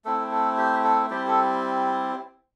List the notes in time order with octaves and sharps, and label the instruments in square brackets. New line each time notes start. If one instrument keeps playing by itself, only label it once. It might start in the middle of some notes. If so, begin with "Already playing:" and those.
[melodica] A3 C4 E4 A4
A4
G4
A4
G3 C4 E4 G4
A4